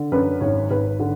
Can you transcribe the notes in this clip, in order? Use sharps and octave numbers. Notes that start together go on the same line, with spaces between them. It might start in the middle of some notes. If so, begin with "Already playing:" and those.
Already playing: D3
F#2 B4
G#1 C#5
G#1 B4
D3